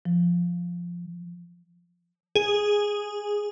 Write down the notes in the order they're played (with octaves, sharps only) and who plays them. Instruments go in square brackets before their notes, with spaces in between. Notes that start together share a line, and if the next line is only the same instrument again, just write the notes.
[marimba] F3
[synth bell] G#4